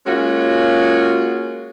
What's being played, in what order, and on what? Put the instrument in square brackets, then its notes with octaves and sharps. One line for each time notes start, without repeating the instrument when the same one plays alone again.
[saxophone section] G#3 A#3 C#4 F4 F#4